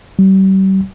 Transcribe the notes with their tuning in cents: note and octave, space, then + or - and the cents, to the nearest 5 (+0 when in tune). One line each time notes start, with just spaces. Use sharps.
G3 -40